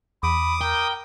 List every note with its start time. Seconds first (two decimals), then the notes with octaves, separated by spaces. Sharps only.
0.23 E2 B5 D6 D#6
0.61 A#4 G5